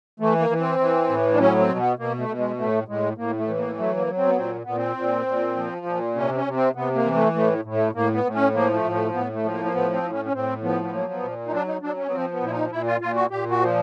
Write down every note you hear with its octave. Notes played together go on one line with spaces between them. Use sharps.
E3 A3
A#3
E3
C4
E3
A2
D4
F#3 C#4
C4
B2
B3
B2 A#3
A3
B2
G#3
A2 A3
A2 G#3
A2 A#3
A3
E3
A#3
F#3 A3
A#3
F#3
C4
B3
A#2 C4
A#2 B3
C4
A#2
A#2
F3
A#2
C3 C#4
C4
C#4
C3
C4
C3 B3
A#3
E3
A3
A2 A3
A2
A3
A2 A#3
B3
A2
C#4
F3 A#3
A3
A2
A3
A2 B3
A3
F3
A#3
A#3
A2 B3
C4
A2
C#4
C#4
A2 C4
F3 B3
B3
F#3 A#3
B3
A#2
D#4
F#3 D4
D#4
F#3 D4
C#4
B3
F3 C4
B3
A#2 E4
D#4
A#2 E4
F4
A#2 F4
F#4
A#2 G4
F#4
F3